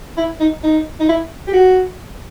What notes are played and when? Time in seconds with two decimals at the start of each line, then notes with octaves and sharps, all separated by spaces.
0.17 E4
0.40 D#4
0.64 D#4
1.00 D#4
1.09 E4
1.47 G4
1.53 F#4